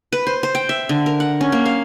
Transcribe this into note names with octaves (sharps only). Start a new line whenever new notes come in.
B4
C5
C5
G5
E5
D3
A#4
F#5
C#4
A#3
F5